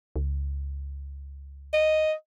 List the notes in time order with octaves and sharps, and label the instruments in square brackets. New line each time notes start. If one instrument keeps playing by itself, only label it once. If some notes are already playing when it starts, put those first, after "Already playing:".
[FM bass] C#2
[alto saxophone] D#5